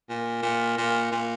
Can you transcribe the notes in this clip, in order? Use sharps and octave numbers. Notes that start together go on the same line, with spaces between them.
A#2
A#2
A#2
A#2